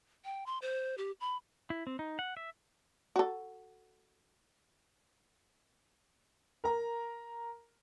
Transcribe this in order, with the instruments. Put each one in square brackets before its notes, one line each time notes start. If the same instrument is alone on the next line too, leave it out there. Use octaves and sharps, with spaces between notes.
[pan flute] G5
C6
C5
G4
B5
[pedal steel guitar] E4
C4
D#4
F#5
E5
[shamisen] F#4 A4
[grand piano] A#4 A#5